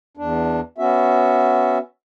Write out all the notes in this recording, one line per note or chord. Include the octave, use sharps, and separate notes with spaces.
E2 D4
B3 C#4 F#4 E5